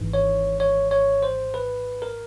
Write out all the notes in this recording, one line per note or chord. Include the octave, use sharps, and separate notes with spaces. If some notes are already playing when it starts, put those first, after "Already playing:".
Already playing: G#1 G#2 E3
C#5
C#5
C#5
C5
B4
A#4